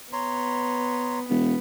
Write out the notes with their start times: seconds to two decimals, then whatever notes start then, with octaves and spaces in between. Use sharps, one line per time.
0.13 B3 C#5 A#5 C6
1.29 E1 B3